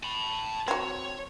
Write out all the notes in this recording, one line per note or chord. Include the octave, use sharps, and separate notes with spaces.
A5 B5
F#3 C4 C#5